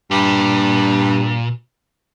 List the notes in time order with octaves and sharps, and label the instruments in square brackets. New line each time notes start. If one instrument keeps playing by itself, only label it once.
[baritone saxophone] G2 [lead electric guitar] A#2